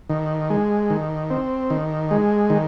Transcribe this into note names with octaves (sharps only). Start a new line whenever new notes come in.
D#3
G#3
D#3
C4
D#3
G#3
D#3